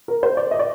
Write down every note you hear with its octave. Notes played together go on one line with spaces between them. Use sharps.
A#4
C5
D5
D#5
D5